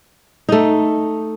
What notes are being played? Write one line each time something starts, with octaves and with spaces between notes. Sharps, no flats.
A3 D#4